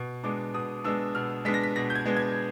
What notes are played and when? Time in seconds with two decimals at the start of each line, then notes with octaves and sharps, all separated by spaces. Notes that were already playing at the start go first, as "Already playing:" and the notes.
Already playing: B2
0.24 G#3 B3 D4 D6
0.54 B2 D#6
0.84 G#3 B3 D4 E6
1.15 B2 F6
1.45 G#3 B3 D4 B6
1.54 A#6
1.63 B6
1.76 B2 A#6
1.90 G6
1.95 G#6
2.05 G#3 B3 D4
2.17 G#6